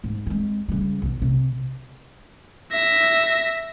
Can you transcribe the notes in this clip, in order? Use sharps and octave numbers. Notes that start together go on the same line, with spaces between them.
G#2
G#3 C4
C#3 G3
B1 B2
C3
E5 A#6